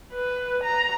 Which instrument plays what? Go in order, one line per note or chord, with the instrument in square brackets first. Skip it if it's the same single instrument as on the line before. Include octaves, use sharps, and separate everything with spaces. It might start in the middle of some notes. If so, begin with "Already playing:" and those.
[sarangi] B4
A#5